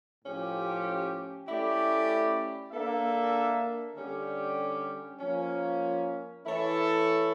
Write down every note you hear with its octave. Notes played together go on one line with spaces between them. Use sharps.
A2 F3 C#4 G4
A3 C#4 E4 G4 D5
A#3 D4 A4 E5
D3 G3 C#4 G4
F3 A#3 C#4
E3 A3 E4 A4 C#5